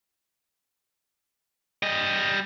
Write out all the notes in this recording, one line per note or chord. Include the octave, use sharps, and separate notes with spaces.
G3 D#5